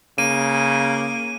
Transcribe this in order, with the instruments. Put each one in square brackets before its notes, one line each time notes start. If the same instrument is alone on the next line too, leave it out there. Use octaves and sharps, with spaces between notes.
[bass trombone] C#3 [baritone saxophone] A#3 [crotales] D#7